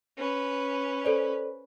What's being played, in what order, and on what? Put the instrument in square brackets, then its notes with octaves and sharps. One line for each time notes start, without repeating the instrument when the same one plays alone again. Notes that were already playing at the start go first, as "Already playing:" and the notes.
[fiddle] C#4 B4
[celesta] A4 C5 D5